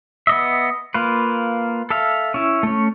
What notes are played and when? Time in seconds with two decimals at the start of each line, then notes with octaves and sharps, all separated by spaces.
0.27 B3 D#5 E5
0.94 A#3 F4 B4
1.90 A4 E5 F5
2.34 C#4 E4
2.63 A3 C#4